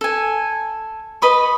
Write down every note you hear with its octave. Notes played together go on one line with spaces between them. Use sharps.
A4 G#5
B4 D#5 B5 C#6